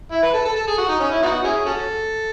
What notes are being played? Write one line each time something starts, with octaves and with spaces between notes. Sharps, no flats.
E4
B4
A4
A4
A4
G#4
F#4
D#4
C#4
E4
B3 D#4 F#4
C#4 E4 G#4
C#4 F#4 A4